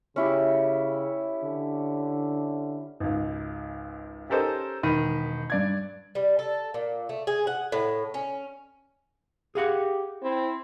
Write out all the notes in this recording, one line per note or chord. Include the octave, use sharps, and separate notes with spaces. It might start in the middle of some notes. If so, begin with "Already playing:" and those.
C#3 C#4 E4 G4
D3
G#1 C#2
C#4 G4 A4 A#4 C5 D#5
E1 D#3 B5 D#7
G2 D5 G#6
G3
A4
A#2
A3
G#4
F#5
A2
C#4
G4 G#4 F5 F#5
C4 E4